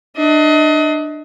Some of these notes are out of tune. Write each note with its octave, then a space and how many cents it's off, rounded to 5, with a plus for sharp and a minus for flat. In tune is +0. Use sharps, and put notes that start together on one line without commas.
D4 +30 D#5 +30